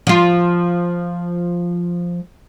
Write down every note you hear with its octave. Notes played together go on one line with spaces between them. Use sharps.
F3 F4